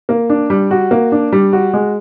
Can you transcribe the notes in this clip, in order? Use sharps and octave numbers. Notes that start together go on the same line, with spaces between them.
A#3
D4
G3
F#4
A#3
D4
G3
F#4
G#3